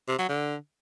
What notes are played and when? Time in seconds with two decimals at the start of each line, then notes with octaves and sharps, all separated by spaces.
0.08 C3
0.19 F#3
0.29 D3